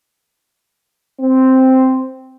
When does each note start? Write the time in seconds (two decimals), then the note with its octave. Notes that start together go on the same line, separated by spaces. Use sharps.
1.21 C4